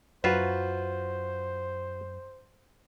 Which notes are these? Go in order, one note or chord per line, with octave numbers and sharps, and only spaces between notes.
F#2 F#3 F4 F#4 B4 C5 E5